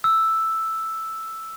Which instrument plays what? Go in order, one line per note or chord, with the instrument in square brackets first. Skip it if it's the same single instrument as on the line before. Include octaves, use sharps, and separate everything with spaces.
[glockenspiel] E6